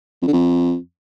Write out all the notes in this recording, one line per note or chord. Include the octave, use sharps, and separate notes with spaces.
F2
D3
F2